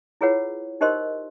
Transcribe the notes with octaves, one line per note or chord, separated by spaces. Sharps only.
E4 F4 G#4 B4 C#5 F#5
D#4 G4 A#4 C5 D#5 C6